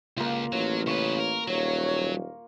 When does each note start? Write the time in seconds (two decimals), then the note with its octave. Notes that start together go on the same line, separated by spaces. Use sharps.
0.17 C#2 A#3 F4
0.53 A1 F#3 C#5
0.87 C#3 B4 C#5 C#6
1.19 A#4
1.48 D#1 F#3 C#5